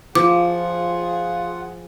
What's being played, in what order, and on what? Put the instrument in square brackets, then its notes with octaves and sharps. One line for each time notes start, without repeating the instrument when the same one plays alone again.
[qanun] F3 [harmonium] F4 F#5 [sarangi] G#4 [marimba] D6